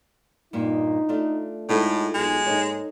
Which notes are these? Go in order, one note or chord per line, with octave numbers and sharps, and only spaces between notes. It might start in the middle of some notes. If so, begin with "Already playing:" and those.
G2 A#2 D#4
A3 D4 F4
A2 G#3 D#4 F4 A4
B1 F#3 G#3
G#2 A#3 D#4 A4 C#5